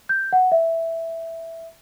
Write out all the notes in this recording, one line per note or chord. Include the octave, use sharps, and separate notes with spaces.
G6
F#5
E5